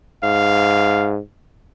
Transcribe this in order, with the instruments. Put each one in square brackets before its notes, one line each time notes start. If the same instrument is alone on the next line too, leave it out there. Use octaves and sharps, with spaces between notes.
[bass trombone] G#2 [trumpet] F5